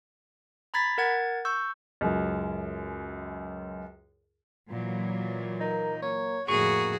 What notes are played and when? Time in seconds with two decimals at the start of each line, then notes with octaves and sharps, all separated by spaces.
0.74 A#5 B5 G#6 A6 B6
0.98 A#4 F#5 G#6 A6
1.45 C#6 E6 G6
2.01 C#2 F#2
4.70 A#2 E3 F#3
5.60 D#4 A#4
6.02 A#3 C#5
6.48 F2 A2 D3 A#3 F#4 G#4 C#6